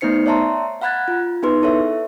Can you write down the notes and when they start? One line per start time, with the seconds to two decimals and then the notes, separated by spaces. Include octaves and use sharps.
0.01 A3 B3 D#4 C5 C7 C#7
0.26 C#5 D5 E5 A5 A#5 C6
0.81 F5 F#5 B5 F#6 G#6 A6
1.08 F4
1.43 B3 D#4 G#4 B4 C6
1.62 E4 A4 C#5 E5